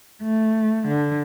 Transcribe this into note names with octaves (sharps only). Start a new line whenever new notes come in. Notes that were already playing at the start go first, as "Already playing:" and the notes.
A3
D3